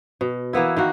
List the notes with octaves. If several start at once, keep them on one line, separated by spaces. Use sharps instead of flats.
B2
E3 A#3 B3 E4
D#3 A#3 F#4